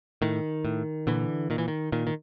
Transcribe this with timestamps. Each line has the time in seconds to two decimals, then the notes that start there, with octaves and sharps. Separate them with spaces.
0.22 A2 D#3
0.65 A2
1.07 A#2 D3 E3
1.50 A#2 D#3
1.58 E3
1.68 D#3
1.92 A#2 D#3
2.07 D#3